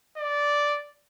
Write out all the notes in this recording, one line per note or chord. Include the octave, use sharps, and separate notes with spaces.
D5